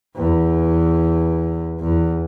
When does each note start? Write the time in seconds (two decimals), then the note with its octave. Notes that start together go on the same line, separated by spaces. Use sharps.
0.16 E2
1.80 E2